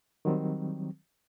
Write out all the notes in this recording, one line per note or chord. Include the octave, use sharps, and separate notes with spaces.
D#3 F#3 G3 C4